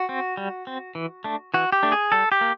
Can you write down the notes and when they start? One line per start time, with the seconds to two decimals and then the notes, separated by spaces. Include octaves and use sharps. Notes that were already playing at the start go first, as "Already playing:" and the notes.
Already playing: F#4
0.09 C4
0.37 G3
0.67 C4
0.95 E3
1.24 A3 D4
1.54 E3 F#4
1.72 G4
1.83 A3 D4
1.92 G#4
2.12 G3 A4
2.32 G4
2.41 A#3